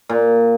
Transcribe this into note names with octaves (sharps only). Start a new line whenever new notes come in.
A#2